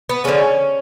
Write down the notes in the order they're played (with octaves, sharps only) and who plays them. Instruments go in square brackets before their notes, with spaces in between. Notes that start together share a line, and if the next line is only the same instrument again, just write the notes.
[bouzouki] B3
D3 F3 G#3 C#4